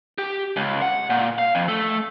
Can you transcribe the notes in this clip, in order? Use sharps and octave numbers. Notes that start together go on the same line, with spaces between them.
G4
C#2
F#5
A#2
F5
F2
A3